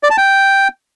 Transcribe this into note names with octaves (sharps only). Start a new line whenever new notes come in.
D5
A5
G5